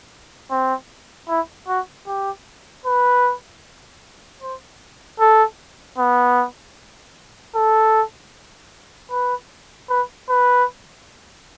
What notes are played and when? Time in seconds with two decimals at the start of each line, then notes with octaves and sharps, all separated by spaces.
0.51 C4
1.29 E4
1.68 F#4
2.07 G4
2.86 B4
4.43 C5
5.20 A4
5.98 B3
7.55 A4
9.11 B4
9.90 B4
10.29 B4